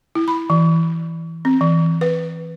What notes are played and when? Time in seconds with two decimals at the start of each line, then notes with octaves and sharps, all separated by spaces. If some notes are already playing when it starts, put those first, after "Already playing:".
0.15 E4
0.28 B5
0.50 E3
1.45 C4
1.61 E3
2.01 B4